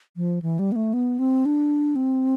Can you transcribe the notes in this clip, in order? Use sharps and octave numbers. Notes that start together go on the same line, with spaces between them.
F3
E3
G3
B3
A3
B3
C4
D4
C4